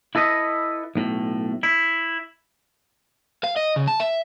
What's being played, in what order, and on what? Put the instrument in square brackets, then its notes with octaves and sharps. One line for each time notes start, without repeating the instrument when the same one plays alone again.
[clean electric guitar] E4 A4 B4 D#5
B1 A2
E4
[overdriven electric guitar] F5
D#5
C#3
A5
E5